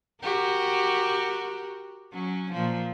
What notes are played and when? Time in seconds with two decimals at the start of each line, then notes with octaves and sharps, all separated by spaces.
0.22 F#4 G4 A#4
2.13 F#3 C#4
2.52 A#2 F3